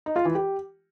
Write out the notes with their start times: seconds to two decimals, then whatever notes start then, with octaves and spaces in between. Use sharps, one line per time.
0.06 D#4
0.16 F4
0.25 E3
0.35 G4